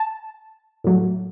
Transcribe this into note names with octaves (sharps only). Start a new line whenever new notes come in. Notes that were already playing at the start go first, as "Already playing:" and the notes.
Already playing: A5
A2 F#3 A3